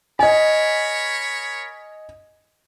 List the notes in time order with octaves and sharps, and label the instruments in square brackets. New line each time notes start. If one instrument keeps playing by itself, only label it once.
[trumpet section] A#4 C#5 B5 [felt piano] D#5 G#5